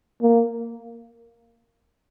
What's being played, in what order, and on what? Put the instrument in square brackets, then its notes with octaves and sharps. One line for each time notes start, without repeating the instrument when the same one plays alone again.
[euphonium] A#3